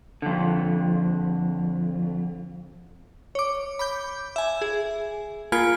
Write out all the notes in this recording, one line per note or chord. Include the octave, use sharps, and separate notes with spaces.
F2 D3
C#5 D6
B5 D6 G6
E5 G#5
G#4
A#3 F4 G#5 B5 C#7 D7